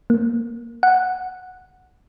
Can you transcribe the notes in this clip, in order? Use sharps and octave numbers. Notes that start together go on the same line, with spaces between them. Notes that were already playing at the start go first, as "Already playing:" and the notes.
A#3
F#5